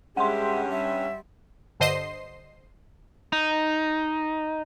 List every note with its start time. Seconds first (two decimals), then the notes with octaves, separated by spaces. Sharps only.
0.17 G2 G#3 C#4 G4 E5 F#5 C6
0.71 G3 E5
1.80 G2 D3 C5 D#5 C6 C7
3.32 D#4